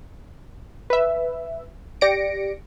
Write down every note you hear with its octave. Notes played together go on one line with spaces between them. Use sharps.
B4 E5
G4 D5 A#6 C#7 D7